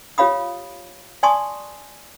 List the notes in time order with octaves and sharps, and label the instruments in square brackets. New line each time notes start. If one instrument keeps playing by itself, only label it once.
[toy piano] F4 G4 C#5 F5 B5 D#6
D5 G#5 A5 C6 C#6 D#6